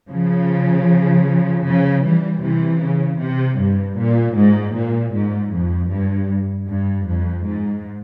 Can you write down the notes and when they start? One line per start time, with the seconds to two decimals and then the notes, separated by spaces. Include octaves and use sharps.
0.11 C#3 F3
1.66 C#3 F3
2.04 E3 G3
2.43 C3 E3
2.81 C#3
3.20 C3
3.59 G2
3.98 A#2
4.37 G#2
4.75 A#2
5.14 G#2
5.52 F2
5.91 G2
6.68 G2
7.07 F2
7.45 G#2